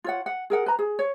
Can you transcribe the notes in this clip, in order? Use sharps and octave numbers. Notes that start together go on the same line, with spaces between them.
F4 C#5 F#5
F#5
G#4 A#4 F#5
B4 A#5
G#4
C#5